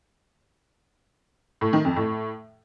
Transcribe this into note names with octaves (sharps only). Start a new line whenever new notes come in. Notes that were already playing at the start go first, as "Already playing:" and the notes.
A2
D#3
F2
A2